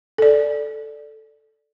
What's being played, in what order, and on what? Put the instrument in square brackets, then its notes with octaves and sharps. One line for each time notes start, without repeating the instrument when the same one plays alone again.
[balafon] A4 D5